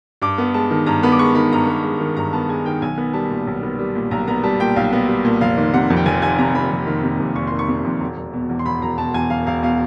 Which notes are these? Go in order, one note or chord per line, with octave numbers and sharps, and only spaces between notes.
G2 D6
B3
G#3 A5
D#3
G2 A#5
B3 B5
D6
G#3 C#6
D#3 B5
G2 A#5
B3
G#3
D#3
G2 A#5
B3 A5
G#3 G#5
D#3 G5
B1 G#5
B3
G3 A5
A#2
B1
B3
G3
A#2
B1 A#5
B3 A#5
G3 A5
A#2 G5
B1 F5
B3
G3
A#2
F1 F5
D#3
C3 F#5
F2
G5
F1 G#5
D#3 G#5
C3 A#5
F2 B5
F1
D#3
C3
F2
F1 C#6
D#3 C6
C#6
C3
F2
E1
E1
B2
E2
C6
E1 B5
E1 A#5
B2 A5
E2 G#5
E1 F5
E1 F5
B2 F5